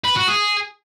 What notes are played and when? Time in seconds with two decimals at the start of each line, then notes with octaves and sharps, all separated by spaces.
0.04 B4
0.16 F#4
0.28 G#4